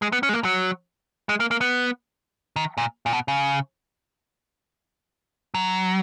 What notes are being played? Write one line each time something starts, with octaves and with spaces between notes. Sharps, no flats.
G#3
B3
C#4
G#3
A#3
F#3
G#3
A#3
A#3
B3
D#3
A#2
A#2
B2
C#3
F#3